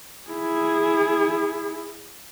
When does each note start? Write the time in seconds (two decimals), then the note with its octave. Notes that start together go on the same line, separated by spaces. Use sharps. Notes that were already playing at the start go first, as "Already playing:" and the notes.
0.30 E4 G#4